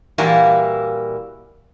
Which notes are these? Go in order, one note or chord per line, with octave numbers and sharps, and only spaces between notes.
A#2 E3 G3 A#3 E4 F#4